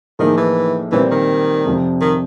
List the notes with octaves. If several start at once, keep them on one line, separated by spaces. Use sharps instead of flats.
A2 D#3 F3 A#3 D#4 G#4
E3
A#2 E3 G3 C4
D#3
F2 C3 F3
D#3